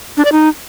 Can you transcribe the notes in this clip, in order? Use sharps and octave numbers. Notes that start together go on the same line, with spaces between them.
D4
D5
D#4